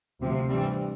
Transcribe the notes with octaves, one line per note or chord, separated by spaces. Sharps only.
D2 C3 F3
G2 E3 G3 C4